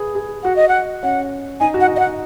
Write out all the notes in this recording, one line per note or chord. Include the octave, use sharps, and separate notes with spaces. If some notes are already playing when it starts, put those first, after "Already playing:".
Already playing: G#4 B4
G#4
F#4 F#5
D#5
F#5
C#4 F#5
D#4 G#5
F#4
F#5
D#4
D#5
F#5